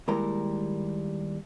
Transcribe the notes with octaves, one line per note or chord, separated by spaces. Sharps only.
D#2 G3 G#3 E4 A#4